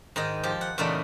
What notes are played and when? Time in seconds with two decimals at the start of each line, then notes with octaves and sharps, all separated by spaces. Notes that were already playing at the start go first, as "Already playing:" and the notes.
0.16 G#2 D#3 D#5
0.43 F3 G4
0.61 F#5
0.78 E2 A#2 C#3 A3 D#4 D5